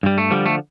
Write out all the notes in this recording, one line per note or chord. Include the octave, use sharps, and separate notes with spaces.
G2 G3
A3
D3 F3 G3
A3